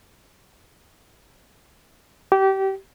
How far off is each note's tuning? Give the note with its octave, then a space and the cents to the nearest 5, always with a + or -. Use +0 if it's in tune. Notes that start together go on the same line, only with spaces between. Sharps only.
G4 -25